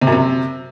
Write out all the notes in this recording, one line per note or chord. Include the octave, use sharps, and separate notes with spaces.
C3
F#2
C3